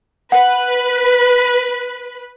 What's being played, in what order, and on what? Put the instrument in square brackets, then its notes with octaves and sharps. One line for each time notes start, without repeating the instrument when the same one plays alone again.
[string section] B4 [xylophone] F#5